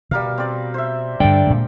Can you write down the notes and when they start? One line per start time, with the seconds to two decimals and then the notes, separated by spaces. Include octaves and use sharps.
0.11 B2 G3 A#4 F5
0.38 C4 D5
0.74 C5 E5
1.20 G2 D3 G3 D5 G5
1.47 A#2 G#3